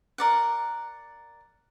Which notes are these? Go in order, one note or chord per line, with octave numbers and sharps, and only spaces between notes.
A#4 D5 F#5